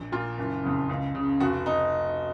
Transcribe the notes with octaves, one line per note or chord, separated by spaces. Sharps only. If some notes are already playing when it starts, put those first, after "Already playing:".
Already playing: A#1
A#2 F4
F#1
F2 C#3
C#2
C#3
F1 F#4
D#4